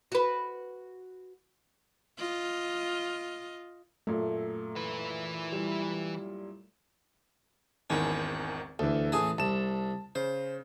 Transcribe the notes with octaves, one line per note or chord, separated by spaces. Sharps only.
F#4 B4
F4 D#5
F#2 A#2 A3
E3 B4
G3 E4 E7
G#1 E2 D#3 C#4
D2 E3 A4
A1 G#4 A5
C2 A5 E7
C#3 C5